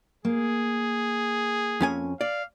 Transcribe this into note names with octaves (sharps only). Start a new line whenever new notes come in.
A#3 G#4
F2 C#4 G#5
D5 F5